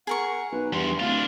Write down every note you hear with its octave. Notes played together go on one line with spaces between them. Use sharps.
G#4 A#4 F#5 C#6
B1 B4
E2 G2 C6
D1 D4 F4 F5